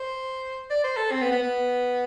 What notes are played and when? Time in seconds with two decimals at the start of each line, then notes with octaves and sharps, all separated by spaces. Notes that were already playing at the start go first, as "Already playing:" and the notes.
Already playing: C5
0.70 D5
0.84 C5
0.97 A4
1.12 C4
1.21 B3
1.31 B3
1.42 B3